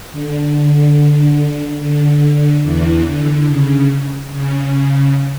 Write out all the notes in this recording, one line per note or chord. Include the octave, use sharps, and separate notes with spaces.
D3
D3
E2 E3
D3
C#3
C#3